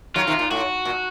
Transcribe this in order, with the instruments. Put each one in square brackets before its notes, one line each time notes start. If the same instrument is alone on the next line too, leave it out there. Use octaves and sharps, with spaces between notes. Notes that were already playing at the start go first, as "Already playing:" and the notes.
[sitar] D#3 F#3 [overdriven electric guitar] F4
[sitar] C3 D#3
A#2
[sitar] A2 [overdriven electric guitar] F#4
[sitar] A#2